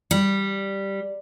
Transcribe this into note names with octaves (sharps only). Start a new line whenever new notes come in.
G3